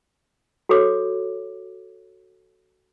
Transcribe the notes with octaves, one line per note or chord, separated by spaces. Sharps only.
F#4 A4 C#5 D6